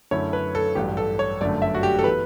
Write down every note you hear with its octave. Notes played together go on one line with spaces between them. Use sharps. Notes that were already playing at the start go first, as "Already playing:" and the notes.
F#2 D3 A3 C#4 E4 C#5
B4
A4
A1 G2 F#3 G4
A4
C#5
G1 F#2 D3 A3 D5
E5
F#4
G4
A4
E3 B3 B4